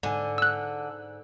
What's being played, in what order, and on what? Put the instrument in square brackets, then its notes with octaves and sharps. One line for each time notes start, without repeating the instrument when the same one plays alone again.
[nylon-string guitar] G#2 G#5 [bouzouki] D3
[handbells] E6 F#6